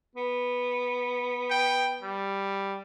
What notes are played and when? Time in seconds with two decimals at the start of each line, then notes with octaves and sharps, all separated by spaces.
0.15 B3
1.51 G5
2.03 G3